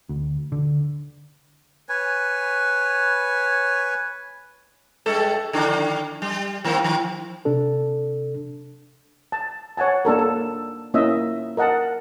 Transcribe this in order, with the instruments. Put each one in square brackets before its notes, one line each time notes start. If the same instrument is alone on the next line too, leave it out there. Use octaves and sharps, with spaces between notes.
[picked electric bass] D2
D3
[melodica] B4 C#5 G#5
[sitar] G2 G#3 A4
D3 D#3 D4
G3
D#3 A#3 C4
D#3
[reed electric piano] C3 D4 A4
[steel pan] A5
C#5 F#5 G#5 A5
A#3 D4 A4 A#4
A4
A#3 C#4 E4 D#5 E5
A#4 D#5 F#5 A5